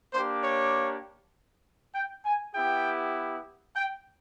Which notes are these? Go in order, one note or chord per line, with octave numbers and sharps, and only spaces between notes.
A#3 D4 G4 C5
C#5
G5
G#5
B3 E4 G4 G5
G5